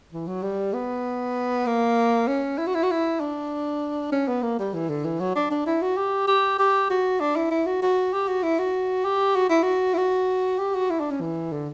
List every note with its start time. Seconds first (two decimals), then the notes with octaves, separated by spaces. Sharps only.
0.13 E3
0.27 F#3
0.43 G3
0.74 B3
1.66 A#3
2.28 C#4
2.58 E4
2.67 F#4
2.75 E4
2.83 F#4
2.91 E4
3.20 D4
4.12 C#4
4.28 B3
4.43 A#3
4.59 G3
4.74 E3
4.89 D3
5.05 E3
5.20 F#3
5.35 D4
5.51 D4
5.67 E4
5.82 F#4
5.97 G4
6.28 G4
6.59 G4
6.90 F#4
7.20 D4
7.36 E4
7.51 E4
7.66 F#4
7.82 F#4
8.13 G4
8.28 F#4
8.43 E4
8.59 F#4
9.05 G4
9.36 F#4
9.50 E4
9.63 F#4
9.94 E4
9.97 F#4
10.59 G4
10.75 F#4
10.90 E4
11.00 D4
11.11 C#4
11.21 E3
11.52 D3